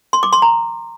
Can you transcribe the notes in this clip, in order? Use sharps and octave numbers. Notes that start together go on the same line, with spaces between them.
C6
D6
C6
A#5